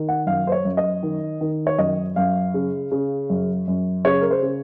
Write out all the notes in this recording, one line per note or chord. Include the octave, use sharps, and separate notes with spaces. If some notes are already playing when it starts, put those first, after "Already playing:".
Already playing: D#3
F#5
F#2 F5
C5
C#5
F#2
D#5
D#3
D#3
C#5
F#2 D#5
F#2 F5
C#3
C#3
F#2
F#2
C#3 C#5
A#4
C5
C#3